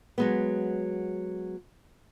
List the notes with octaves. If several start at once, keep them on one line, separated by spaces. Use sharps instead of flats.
F#3 G#3 B3